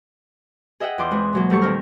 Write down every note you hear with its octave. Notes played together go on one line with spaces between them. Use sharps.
G#4 D#5 E5 F#5 G5
E2 F4 C6 D6 G6
E3 G#3 C4
B2 F#3 A#3
E2 G3 A3 G4 A5 C#6
A#2 D#3 A#3 C4 A#4 F6